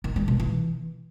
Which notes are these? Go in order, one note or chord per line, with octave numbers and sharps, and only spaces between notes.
D#3
G#3
B2
E3